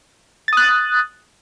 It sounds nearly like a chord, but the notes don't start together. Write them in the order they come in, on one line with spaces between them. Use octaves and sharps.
A6 D#6 F#6